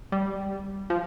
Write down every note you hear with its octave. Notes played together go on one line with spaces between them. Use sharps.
G3
F3